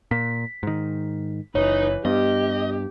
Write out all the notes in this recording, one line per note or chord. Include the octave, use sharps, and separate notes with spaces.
A#2 B6
G#2 D#3
F#1 E3 D#4 B4 C#5
G2 B3 G4 D#5